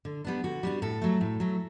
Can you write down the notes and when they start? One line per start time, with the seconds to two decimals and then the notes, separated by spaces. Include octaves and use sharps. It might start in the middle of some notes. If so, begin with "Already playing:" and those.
0.05 D3
0.25 G3 B3 D4
0.44 D3 F#4
0.63 G3 B3 D4
0.82 A2 A4
1.01 F#3 A3
1.21 A2
1.40 F#3 A3